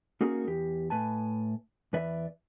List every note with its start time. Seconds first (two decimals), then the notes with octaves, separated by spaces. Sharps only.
0.21 A#3 C#4 D#4 F#4 G#4 A#4
0.47 E2 G4
0.90 A2 B4 G#5 A5
1.93 E2 E3 B4 D5 E5